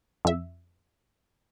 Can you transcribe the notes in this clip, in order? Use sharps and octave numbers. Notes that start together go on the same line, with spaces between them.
F2 E5